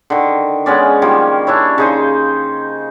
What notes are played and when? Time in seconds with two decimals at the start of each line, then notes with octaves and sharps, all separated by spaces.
0.10 D3 D#3
0.66 G#3 B3 C#4 D5
1.02 D#3 F3 G3 A#3
1.47 C#4 D4 E4 C#5
1.78 C#3 D#4 C5